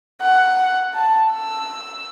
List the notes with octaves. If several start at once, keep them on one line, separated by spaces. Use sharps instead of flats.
F#5
A5
E6